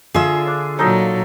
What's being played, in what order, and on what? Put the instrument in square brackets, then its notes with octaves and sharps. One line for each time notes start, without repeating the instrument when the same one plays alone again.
[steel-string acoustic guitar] D3 E5 [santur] F4 G#4
[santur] D4
[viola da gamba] A#2 F#3 [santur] D#4 A4 D#5